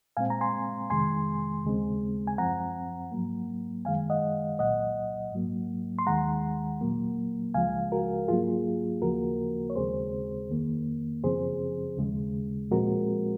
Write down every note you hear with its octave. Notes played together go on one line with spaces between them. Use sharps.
A#2 G#3 C4 F5 G#5
A#5
G#5 C6
F2 C3 D#3 G#3 G#5 C6
D#2 C#3 G#3 C4
G#5
F#2 F3 C4 F#5 A#5
G#2 F#3 A#3
F#2 D#3 G#3 F5 G#5
D#5 F#5
C2 A#2 F#3 D#5 F#5
G#2 F#3 A#3
C6
D#2 D#3 G#3 F#5 A#5
A#2 F#3 A#3
C#2 C#3 F3 G#3 F5 G#5
F#4 A#4
G#2 F#3 A#3 F4 G#4
D#2 C#3 F3 A#3 F#4 A#4
C#5
D#2 C#3 G#3 C4 G#4 C5
F2 D#3 A#3
F#2 C#3 F3 C4 G#4 C5
D#2 C#3 G#3
A#2 F3 G#3 C4 F#4 A#4